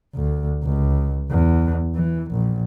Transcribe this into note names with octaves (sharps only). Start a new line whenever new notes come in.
D2
C#2
E2
E3
A#1